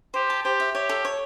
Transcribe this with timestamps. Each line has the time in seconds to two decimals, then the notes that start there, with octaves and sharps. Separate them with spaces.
0.14 G4 C5
0.30 A5
0.44 G4 C5
0.60 E5
0.74 G4 C#5
0.89 A4
1.05 C#5